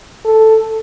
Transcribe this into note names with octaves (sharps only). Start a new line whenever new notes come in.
A4